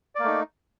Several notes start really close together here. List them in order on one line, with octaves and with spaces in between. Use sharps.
D5 A#3 A3 D#4